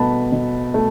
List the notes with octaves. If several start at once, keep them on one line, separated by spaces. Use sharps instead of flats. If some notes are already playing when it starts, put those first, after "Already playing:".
Already playing: B2 A3 A5 B5
B2
A3